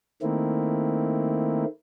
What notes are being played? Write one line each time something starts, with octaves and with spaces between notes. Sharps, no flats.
D#3 A3 A#3 C4 E4